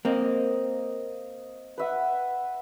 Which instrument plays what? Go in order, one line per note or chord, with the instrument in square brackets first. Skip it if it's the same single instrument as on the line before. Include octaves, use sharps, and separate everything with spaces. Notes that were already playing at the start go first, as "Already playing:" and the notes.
[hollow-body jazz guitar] A#3 C4 [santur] D#5 F5 D#6
[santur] B4 E5 F#5